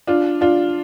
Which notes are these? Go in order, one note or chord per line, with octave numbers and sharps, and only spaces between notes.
D4 F4
D4 F4